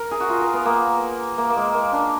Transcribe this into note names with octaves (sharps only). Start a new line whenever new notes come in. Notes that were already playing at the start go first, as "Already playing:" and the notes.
Already playing: A#4
G#4
F#4
F4
A#4
B3
A#3
A#3
A#3
G#3
A#3
D4